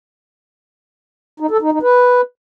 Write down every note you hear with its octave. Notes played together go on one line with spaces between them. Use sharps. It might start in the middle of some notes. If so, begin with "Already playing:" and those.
D#4
A4
D#4
D#4
B4